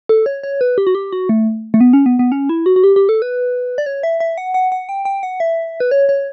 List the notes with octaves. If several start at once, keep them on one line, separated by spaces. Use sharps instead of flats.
A4
C#5
C#5
B4
G4
F#4
G4
F#4
A3
A3
B3
C#4
B3
B3
C#4
E4
F#4
F#4
G4
G4
A4
B4
D5
C#5
E5
E5
F#5
F#5
F#5
G5
G5
F#5
E5
B4
C#5
C#5